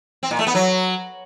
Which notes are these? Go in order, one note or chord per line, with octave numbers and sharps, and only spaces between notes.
C4
A#2
A3
B3
F#3